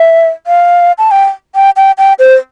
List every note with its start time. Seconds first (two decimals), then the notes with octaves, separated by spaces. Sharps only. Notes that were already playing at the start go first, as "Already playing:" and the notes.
Already playing: E5
0.47 F5
0.98 A5
1.11 G5
1.55 G5
1.76 G5
1.98 G5
2.19 C5